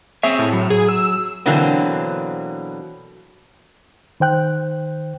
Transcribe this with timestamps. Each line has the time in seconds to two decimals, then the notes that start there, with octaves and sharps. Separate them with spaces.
0.23 C4 G#4 C#5 E5
0.39 A2
0.53 F#3
0.70 G#4
0.89 E6
1.46 B2 D3 E3 F#3 A#3 C4
4.20 D#3 C5 G5 F#6